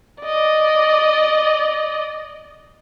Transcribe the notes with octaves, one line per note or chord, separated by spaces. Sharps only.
D5 D#5